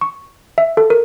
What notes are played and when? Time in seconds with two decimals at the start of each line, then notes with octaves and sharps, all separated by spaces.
0.01 C#6
0.58 E5
0.77 A4
0.90 A#4